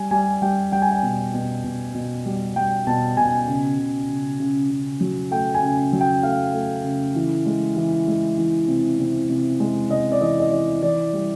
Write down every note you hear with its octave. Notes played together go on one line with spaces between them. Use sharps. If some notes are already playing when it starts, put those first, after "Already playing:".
Already playing: G3 G#5
G3 G#5
G3 G5
G3 G5
G#5
G5
B2
B2
B2
B2
G3
G3 G5
B2 A5
B2 G#5
C#3
C#3
C#3
C#3
C#3
F#3
A3 G5
G#5
C#3
F#3
G5
A3 F5
A3
C#3
E3
G#3
E3
G#3
E3
C3
C3
C3
G#3
C3 D#5
D5
E3 D#5
D#5
E3 D5
E3 D5
G3